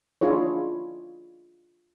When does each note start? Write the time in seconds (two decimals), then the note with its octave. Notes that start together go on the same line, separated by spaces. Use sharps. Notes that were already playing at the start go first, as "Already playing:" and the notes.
0.21 D4 E4 F4 G#4 C#5